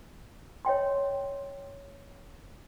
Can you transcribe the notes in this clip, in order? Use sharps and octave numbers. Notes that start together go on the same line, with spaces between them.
C#5 D#5 G5 C6